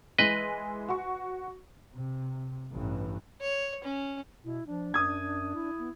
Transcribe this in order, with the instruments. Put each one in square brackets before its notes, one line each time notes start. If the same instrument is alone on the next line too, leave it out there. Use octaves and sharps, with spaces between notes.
[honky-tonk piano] E3 G#3 [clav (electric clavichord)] B4 D#5
[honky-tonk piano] F#4 C#6
[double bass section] C3
A1 G2 E3
[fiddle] C#5
C#4
[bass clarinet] B2 [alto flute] E4
[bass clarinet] F3 [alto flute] D4
[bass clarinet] F#2 [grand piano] D#6 G#6
[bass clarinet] E4
[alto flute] B3